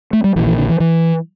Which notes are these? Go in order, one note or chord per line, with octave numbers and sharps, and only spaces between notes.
A3
G3
A#1 A#2 E3
E3
D3
E3
E3